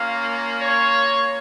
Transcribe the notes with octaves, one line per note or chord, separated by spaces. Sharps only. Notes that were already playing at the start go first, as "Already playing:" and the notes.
Already playing: A#3 C#4 F4 F5
C#5